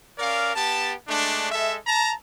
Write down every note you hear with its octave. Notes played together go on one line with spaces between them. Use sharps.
C#4 A#4 D5 F5
B3 G4 A5
G#3 A3 D4
G#3 A4 E5
A5 A#5